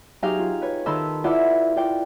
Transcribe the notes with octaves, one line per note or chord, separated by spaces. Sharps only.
F#3 D#4 G4 G#4 F5
F4
B4 C#5
D#3 D#4 A4 B5 C6 E6
E4 F4 B4 D5 E5 F#5
F4 D5 G5